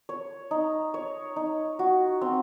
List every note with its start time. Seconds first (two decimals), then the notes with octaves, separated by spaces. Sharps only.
0.09 C#5
0.51 D#4
0.94 C#5
1.36 D#4
1.79 F#4
2.21 C4